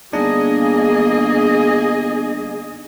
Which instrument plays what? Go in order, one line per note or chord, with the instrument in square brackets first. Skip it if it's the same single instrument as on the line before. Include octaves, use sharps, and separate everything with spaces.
[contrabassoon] G1 [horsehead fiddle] A#3 D#5 [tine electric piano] D4 D#4 [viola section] G#4